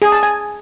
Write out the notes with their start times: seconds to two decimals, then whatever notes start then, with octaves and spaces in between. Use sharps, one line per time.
0.02 G#4
0.12 A5
0.23 G#5